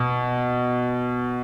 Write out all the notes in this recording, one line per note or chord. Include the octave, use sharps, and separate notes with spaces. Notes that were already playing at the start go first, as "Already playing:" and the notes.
Already playing: B2